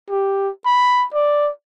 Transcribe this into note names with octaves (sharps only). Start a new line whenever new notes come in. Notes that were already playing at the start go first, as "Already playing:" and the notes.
G4
B5
D5